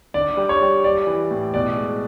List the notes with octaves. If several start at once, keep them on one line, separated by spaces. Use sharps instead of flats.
D3 D5
G3
C#5
G3
G3 D5
E3
A2
B2 D5
G#3